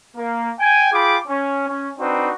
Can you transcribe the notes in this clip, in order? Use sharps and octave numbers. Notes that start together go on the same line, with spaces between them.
A#3
G5 G#5
F4 G#4 G5 B5 D6
C#4
C#4
C4 D4 D#4 F#4 B4